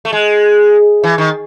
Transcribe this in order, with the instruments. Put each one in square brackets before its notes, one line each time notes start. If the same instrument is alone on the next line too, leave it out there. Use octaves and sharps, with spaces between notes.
[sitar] A3
G#3
E3
D#3